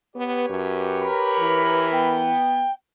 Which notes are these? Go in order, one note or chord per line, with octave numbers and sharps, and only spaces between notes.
B3 G4 B4 C#5
F#2
A#4 B5
E3
B3 G5